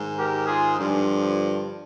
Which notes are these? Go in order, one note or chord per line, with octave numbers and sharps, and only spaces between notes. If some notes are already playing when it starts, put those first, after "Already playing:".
Already playing: G#2 D#3
G4 A#4
F4 G#4
G2 D3 F3